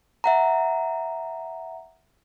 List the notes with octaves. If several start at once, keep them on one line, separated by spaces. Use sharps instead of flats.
E5 F#5 A#5